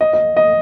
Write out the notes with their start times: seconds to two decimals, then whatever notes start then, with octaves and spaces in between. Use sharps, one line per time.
0.01 D#5
0.13 D#5
0.37 D#5